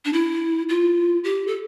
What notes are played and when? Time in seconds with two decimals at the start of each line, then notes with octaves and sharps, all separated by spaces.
0.05 D4
0.13 E4
0.69 F4
1.24 G4
1.47 A4